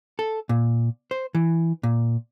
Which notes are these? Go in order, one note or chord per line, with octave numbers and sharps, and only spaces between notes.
A4
A#2
C5
E3
A#2